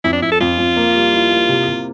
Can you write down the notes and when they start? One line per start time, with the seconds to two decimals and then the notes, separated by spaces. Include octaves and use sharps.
0.04 F2 E4
0.13 D4
0.22 F2 E4
0.32 A4
0.40 F2 F4
0.59 F2
0.77 A#3
0.95 G3
1.13 E4
1.31 A#3
1.49 C3
1.68 C3